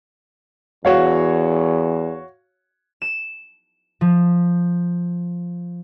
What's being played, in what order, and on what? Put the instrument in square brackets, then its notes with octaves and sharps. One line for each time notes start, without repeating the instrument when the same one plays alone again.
[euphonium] E2 [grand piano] F#4 C#5 F5
[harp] E7
F3